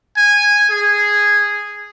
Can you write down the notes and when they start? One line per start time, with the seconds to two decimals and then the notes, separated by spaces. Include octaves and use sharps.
0.17 G#5
0.71 G#4